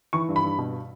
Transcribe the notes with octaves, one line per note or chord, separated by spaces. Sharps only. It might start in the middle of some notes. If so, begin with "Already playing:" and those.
E3 C#6
G2
B5
G2
B2